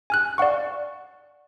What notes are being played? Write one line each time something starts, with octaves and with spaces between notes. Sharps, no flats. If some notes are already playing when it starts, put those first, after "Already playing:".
G#5 F6 F#6
D5 F5 F#5 C#6